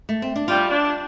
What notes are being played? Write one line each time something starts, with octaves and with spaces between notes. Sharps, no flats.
A3
C4
D4
G3 F4
D4